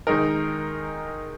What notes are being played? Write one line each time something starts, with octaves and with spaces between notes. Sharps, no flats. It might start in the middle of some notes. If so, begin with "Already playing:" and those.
D#3 G#3 D#4 A#4